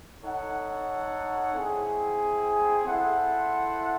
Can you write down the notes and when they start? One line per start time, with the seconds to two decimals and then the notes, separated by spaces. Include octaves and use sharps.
0.23 D#4 A4 C#5 F#5
1.54 C4 E4 G#4
2.86 E4 A4 C5 F#5